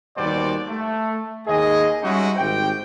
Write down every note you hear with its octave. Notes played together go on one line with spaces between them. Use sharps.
D#2 B2 G3 C5 D5
A3
D#2 G#4 D#5
G3 G#3 C#4 D#4 E4 F#4
G#1 G4 C5 G5